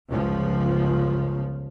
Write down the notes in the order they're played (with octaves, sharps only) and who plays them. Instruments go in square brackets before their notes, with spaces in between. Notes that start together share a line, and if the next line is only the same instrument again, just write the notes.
[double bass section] G1 C#2 C#3 F3